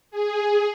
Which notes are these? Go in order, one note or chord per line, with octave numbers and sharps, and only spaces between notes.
G#4